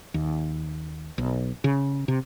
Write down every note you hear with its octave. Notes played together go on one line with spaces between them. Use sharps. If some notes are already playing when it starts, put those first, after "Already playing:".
D#2
B1
C#3
C3